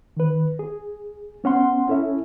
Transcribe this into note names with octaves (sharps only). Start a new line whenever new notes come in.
D#3 B4
G#4
B3 C#4 F#5 C6
C#4 E4 A4 C#5 E5